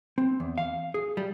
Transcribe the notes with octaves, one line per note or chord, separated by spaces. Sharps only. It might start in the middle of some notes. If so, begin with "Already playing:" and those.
C4
E2
F5
G#4
G3